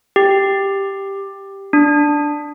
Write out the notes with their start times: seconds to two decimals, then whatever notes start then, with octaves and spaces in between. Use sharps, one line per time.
0.16 G4
1.73 D4